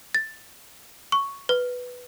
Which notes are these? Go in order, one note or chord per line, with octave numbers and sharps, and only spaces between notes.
A6
C#6
B4